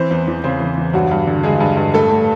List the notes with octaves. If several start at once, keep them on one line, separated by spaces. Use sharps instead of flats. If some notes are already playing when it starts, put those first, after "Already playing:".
Already playing: E3 C4 C5
E2
E2
C#3 C4 C5
E3
E2
G2 F#3 F#4
G2
D3
D3 G#3 G#4
G2
G2
A2 A3 A4
A2